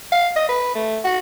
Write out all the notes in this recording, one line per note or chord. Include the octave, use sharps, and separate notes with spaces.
F5
D#5
B4
A3
F#4